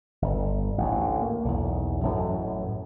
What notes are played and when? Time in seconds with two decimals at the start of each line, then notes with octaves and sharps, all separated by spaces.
0.22 G1
0.78 A1 D2
1.22 A#3
1.45 B1 E2
2.03 A1 F#2 A2